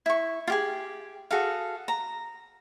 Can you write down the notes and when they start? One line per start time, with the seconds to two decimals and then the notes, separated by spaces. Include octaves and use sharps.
0.06 E4 C#6
0.47 F4 G4 G#4
1.31 F#4 G#4 A4 F5
1.88 A#5